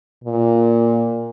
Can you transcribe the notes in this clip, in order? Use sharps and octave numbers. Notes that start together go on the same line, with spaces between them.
A#2